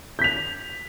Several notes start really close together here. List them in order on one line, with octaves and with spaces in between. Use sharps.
G6 B6 F7